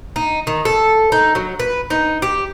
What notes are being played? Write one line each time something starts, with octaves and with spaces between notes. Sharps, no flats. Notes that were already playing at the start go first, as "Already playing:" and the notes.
D#4
D#3
A4
D#4
F#3
B4
D#4
G4